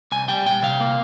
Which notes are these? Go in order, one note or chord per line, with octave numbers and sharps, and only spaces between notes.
C2 G#5
G3 G5
A#2 G5
C3 F5
A#3